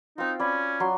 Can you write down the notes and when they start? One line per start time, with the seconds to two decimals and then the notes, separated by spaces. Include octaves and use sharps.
0.18 C4 D#4 F4
0.39 C#4 D5 B5
0.80 F#3 F#4 C6